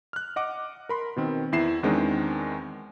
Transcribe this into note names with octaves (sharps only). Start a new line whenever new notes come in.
F6 F#6
D#5 F#5 D6
A#4 B5 C6
B2 D#3 C4
E2 E4 C7 E7
E2 D#3 G#3 C4 D4 D#4